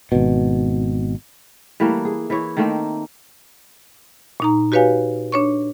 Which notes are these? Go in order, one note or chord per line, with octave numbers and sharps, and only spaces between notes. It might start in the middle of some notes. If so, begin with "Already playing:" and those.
G#1 B2
E3 G3 A3 A#3
G#4
E3 E4 C#5
D#3 A3 A#3 C4
A#2 D#4 A#5
F#4 G4 B4 C#5 F5 G#5
D4 C#5 C#6